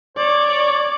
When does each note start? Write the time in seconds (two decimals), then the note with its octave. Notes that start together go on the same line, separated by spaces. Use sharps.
0.17 C#5 D5